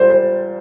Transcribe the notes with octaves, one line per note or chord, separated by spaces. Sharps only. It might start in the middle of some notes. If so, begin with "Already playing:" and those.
Already playing: A#2 G3 C5
C5